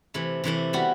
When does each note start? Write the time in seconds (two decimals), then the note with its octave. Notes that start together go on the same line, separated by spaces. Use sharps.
0.14 C3 E3 A3 E4
0.44 C3 E3 A3 E4
0.73 G3 B3 F#4